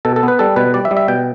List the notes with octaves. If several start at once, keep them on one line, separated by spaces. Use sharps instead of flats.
B2 A4
A4
B3 B4
G3 A4
B2 B4
G3 D5
E5
G3
E5
B2 G5